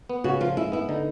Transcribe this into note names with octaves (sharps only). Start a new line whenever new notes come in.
B3
C#3 F#4
F3 F4
G#3 E4
B3 E4
D3 D#4